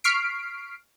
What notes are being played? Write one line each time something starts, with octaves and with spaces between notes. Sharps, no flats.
C#6 F6 B6 C7 D7